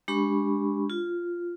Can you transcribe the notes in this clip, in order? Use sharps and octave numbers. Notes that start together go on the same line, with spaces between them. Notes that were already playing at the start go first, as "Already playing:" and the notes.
G#3 D4 G4 B5 C#6
F4